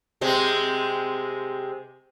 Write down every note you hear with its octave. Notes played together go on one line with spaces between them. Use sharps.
C3 G#3 C4